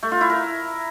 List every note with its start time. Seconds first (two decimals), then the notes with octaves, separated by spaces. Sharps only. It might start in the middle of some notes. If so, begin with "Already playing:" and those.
0.03 A3
0.12 F4
0.21 E4
0.30 A#4